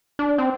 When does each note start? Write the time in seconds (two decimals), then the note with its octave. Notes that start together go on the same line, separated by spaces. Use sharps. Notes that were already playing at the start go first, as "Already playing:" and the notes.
0.19 D4
0.38 C4